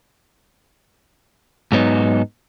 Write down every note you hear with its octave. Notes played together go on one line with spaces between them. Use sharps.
G#2 F#3 B3 D#4